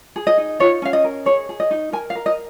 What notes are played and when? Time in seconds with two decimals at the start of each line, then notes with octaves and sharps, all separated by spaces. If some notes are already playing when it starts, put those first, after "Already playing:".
0.16 G#4
0.27 D#5
0.38 D#4
0.60 F4 C#5
0.82 C#4 F5
0.93 D#5
1.04 A#4
1.26 G#4 C#5
1.49 G#4
1.60 D#5
1.71 D#4
1.92 A#4 G#5
2.10 F5
2.15 A#4
2.26 D#5